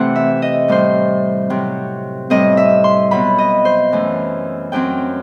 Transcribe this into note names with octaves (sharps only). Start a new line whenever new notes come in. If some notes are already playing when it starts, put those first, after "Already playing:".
Already playing: C3 E3 A3 C4 F#5
E5
D#5
A2 G3 C4 C5
C3 F#3 C4
A2 G3 C4 D#5
E5
C6
B2 F#3 B3 B5
D#5
C5
F#2 E3 A3
F#2 F#3 C4 G5